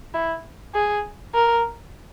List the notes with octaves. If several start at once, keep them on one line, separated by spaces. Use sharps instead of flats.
E4
G#4
A#4